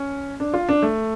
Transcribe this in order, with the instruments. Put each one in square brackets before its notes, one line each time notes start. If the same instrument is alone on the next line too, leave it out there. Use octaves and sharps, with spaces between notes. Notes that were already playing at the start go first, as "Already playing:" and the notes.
Already playing: [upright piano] C#4
D4
F4
D4
A3